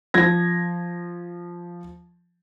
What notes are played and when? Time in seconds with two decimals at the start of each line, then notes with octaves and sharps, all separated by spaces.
0.14 F3 G#6 A#6